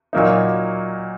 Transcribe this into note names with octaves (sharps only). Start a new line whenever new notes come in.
A#2 F#3 A#3 D#4